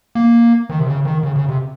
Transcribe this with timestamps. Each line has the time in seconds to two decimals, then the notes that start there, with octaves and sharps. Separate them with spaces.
0.15 A#3
0.69 D#3
0.80 C3
0.87 C#3
1.05 D#3
1.23 C#3
1.36 C#3
1.49 C3